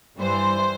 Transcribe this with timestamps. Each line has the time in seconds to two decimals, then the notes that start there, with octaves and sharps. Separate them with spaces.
0.19 G2 E3 G3 C5